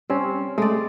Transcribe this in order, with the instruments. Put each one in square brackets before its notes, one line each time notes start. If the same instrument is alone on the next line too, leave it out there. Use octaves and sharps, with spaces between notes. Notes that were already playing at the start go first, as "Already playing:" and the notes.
[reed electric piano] G3 C#4 [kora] C4
[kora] G#3 D5 [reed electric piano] A3